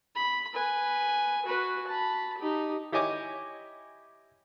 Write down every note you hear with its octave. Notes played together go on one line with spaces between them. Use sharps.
B5
B4 G#5
F#4 B4
A5 B5
D#4 G4
E4 G4 C#5 D#5 G#5 D6